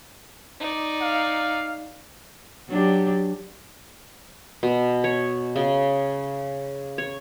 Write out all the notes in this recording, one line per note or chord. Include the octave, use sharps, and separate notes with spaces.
D#4 D5
F5
F#3 D4 G4
B2
C#5
C#3
C#5